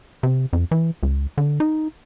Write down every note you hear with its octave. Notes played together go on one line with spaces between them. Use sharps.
C3
F2
E3
C#2
D3
D#4